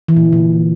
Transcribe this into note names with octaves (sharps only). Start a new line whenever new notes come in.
E3
A#2
D3
A#2